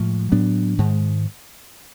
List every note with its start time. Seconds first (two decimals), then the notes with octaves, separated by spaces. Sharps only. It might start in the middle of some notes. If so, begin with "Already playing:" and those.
Already playing: A2 F3 G#3
0.32 A2 F#3 B3 D4
0.78 G#2 D#3 G#3